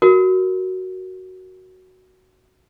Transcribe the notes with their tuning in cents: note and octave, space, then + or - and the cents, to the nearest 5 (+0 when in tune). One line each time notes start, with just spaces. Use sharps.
F#4 +5 A#4 +0 E6 +40